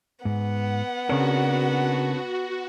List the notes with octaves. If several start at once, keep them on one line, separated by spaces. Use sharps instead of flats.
G#2 B3 F#5
C#3 C4 D4 F#4 A#4 C#5